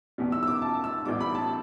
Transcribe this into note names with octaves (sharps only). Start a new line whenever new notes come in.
E2 B2 G3
E6
E6
D6
A5
E6
A1 A2 G3 B3 D6
B5
A5